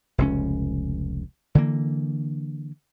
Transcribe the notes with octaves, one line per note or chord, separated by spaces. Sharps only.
F1 C#2 C#4
D3 E3 A#3